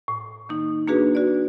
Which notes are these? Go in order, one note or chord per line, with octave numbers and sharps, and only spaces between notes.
A2
D#3 A#3 D#4
A#3 D4 F#4 G#4 B4
F#4 D5